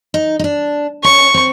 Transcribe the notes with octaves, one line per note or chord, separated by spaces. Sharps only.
D#4
D#4
D4
C#4 C#6
C4